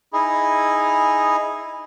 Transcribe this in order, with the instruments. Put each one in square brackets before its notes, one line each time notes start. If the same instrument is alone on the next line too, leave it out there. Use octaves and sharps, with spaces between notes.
[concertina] D#4 E4 G#4